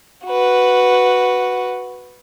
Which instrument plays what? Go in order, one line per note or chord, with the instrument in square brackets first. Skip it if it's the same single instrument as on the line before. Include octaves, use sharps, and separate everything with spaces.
[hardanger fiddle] F#4 B4